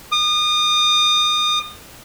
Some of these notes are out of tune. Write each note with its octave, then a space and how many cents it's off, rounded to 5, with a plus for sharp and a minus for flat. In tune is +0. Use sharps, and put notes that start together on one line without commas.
D#6 -35